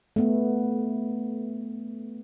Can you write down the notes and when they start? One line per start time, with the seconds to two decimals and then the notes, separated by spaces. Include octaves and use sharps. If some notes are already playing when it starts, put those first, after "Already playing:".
0.16 A3 B3